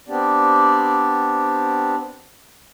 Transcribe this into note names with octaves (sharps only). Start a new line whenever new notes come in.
B3 C4 D4 G4 D5